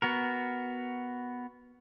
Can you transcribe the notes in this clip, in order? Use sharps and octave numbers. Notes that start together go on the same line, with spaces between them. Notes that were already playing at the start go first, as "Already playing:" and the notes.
B3 F#4 A#4